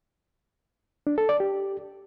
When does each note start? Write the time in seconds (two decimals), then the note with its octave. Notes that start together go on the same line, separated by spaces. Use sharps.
1.07 D4
1.18 A4
1.29 D5
1.40 G4